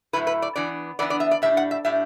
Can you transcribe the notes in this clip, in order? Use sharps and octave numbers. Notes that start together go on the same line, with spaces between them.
A2 F#3 A3 E4 B4
B4
D5
E3 B3 D4 D5
E3 B3 D4 D5
D5
E5
D5
A2 G3 D4 E5
F#5
E5
A2 G3 D4 E5